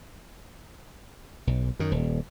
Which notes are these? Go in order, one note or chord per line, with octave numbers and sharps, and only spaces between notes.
B1
F#2 D#3
D#1